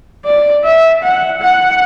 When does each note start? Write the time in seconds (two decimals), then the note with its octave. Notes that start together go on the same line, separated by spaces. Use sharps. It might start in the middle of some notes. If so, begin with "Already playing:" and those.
0.25 D5
0.64 E5
1.03 F#5
1.41 F#5